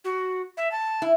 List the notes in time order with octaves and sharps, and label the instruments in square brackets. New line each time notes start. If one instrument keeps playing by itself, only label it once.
[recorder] F#4
E5
A5
[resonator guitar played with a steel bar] E4